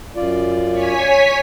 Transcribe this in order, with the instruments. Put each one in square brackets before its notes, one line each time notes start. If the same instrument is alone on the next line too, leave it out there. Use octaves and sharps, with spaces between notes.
[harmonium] F#2 F4 D5
[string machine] C#5 G#5 B6